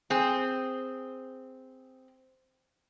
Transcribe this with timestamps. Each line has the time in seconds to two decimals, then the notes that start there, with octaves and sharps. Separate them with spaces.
0.10 C4 G#4